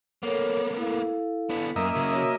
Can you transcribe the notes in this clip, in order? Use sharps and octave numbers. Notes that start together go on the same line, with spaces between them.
A#3 B3 A4 A#4 C#5
E4 A4 F5
B3 D4
F#2 A#3 D#5 E5
C#3 F#3
F#4 C#5